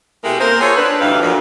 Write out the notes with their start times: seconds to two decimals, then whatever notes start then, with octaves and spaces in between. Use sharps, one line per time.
0.24 B2 G#3 A3 E4 G4 A#4
0.40 A#3 A#4 C5
0.61 F4 G#4 A4 C5 C#5
0.76 D4 B4
1.01 D2 G2 E3 D#4 G4 F5
1.22 D2 A#2 F3